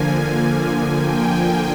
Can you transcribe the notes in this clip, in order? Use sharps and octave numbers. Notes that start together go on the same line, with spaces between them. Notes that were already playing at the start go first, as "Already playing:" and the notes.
Already playing: D3 F3 A#3 G#5
G5